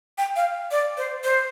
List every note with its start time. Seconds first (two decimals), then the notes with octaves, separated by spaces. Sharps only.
0.18 G5
0.36 F5
0.71 D5
0.97 C5
1.24 C5